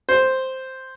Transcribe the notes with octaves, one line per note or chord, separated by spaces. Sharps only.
C5